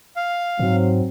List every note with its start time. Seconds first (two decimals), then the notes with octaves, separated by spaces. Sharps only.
0.16 F5
0.59 G#2 F#3 C4